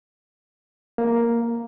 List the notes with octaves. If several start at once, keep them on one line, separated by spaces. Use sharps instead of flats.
A#3